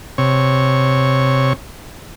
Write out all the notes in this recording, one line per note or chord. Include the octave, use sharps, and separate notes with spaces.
C3 C#5